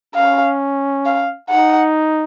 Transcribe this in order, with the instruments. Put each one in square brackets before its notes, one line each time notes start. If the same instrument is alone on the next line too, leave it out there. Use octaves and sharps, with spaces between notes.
[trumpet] C#4 [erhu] F5
[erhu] F5
[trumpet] D#4 [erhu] F#5